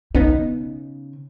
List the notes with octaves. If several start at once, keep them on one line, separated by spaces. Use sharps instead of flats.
C#3 B3 C#4 D#4